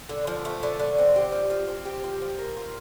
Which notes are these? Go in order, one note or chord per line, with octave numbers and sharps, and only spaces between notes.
D3
F3
A3
D3
D3
C4
G4
F3
F3
C4
G4
F3
F3
A#3
F4